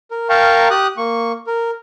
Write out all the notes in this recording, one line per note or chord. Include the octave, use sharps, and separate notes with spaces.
A#4
A#4 F5 G5 A5 A#5 C#6
G4 D#6 F#6
A#3 C#6
A#4